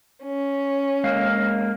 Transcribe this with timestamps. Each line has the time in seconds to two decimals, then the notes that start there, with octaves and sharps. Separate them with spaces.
0.23 C#4
1.04 G#3 A#3 F5